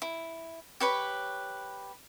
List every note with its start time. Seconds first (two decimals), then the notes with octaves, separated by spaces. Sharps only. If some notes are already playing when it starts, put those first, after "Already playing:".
0.02 E4
0.80 G4 B4 C#5 B5